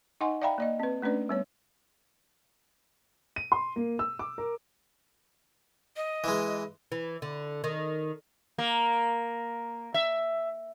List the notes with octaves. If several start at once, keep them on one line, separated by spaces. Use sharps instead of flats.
D#4 D#5 F#5 G#5 C6
D5 E5 F5 G5 A#5 B5
A#3 D5 D#5
C4 B4
A3 C#4 D4 B4 D5
G3 B3 C#5
D#7
C6
A#3
E6
D6
A#4
D#5
E3 G#3
E3
D3
D#3
A#3
E5